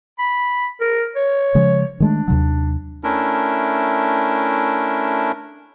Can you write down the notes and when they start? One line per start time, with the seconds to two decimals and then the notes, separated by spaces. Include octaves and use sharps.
0.19 B5
0.81 A#4
1.16 C#5
1.55 C#3 F3 G#3
2.00 D#3 G#3 A3 D4
2.28 D#2 C3 F#3
3.04 A3 C#4 D4 E4 A#4